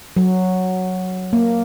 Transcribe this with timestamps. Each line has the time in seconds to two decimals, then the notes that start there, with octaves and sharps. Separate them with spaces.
0.17 F#3
1.33 A#3